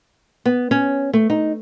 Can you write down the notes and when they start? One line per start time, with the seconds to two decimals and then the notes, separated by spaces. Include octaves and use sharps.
0.46 B3
0.71 C#4
1.13 A3
1.30 D#4